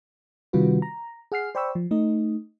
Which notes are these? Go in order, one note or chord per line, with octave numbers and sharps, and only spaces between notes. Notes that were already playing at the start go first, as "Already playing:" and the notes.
C3 D#3 G3 F4 F#4 B4
A#5
G#4 F#5 F6 C7
C5 D5 G5 B5 C#6 E6
F3
A3 D#4 D#5